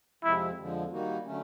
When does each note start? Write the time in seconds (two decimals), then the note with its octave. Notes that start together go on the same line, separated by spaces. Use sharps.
0.23 F2 C3 F3 G#3 C4 E4
0.58 F2 D3 F3 G#3
0.91 D#3 G3 A#3 D#4 F#4
1.24 D3 F#3 A3 C#4